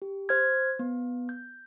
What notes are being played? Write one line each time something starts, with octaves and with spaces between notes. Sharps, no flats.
G4
C5 F6 G#6
B3
G6